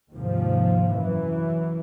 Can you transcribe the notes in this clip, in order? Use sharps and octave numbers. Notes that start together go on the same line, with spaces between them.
D#2 G#2 C3 F3
F#2 E3